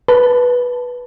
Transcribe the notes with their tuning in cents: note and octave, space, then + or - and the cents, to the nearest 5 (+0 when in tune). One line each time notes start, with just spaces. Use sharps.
B4 -5 A5 +0